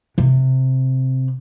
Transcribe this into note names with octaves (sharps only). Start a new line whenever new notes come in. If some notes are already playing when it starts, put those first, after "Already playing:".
C3